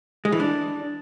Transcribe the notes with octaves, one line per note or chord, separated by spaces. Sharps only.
G#3
E3
D4